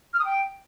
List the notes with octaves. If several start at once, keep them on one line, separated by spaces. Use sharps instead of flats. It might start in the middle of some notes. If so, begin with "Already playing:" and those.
F6
D#6
G5